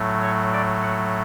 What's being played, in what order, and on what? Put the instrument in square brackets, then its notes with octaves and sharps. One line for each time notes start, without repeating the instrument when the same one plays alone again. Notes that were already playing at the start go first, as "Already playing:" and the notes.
Already playing: [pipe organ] A2 F#3 A3
C#5
D5
F#5